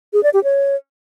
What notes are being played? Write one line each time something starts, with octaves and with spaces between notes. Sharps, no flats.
G#4
D5
G4
C#5